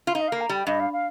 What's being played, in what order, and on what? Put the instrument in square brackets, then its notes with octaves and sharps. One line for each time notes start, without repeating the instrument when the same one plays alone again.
[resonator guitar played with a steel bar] F4
[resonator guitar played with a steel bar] D#4 [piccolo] F5
[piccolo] D#5
[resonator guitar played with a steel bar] A#3 [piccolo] F5
[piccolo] A#5
[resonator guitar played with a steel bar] G3 [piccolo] G5
[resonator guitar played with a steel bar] G2 [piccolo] D#5
[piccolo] F5
F5